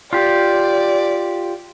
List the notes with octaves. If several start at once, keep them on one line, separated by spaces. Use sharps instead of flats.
F4 G4 D5